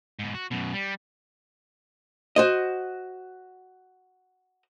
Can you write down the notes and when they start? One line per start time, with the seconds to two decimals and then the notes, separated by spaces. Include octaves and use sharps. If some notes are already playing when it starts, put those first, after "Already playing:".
0.19 G#2 B2
0.34 F#4
0.51 F#2 B2
0.73 G3
2.36 F#4 C5 D#5